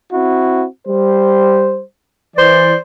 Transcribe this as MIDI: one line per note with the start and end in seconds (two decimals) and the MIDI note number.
0.12 0.65 60
0.12 0.65 64
0.12 0.65 66
0.87 1.81 55
0.87 1.81 72
2.36 2.73 52
2.36 2.74 72
2.36 2.74 74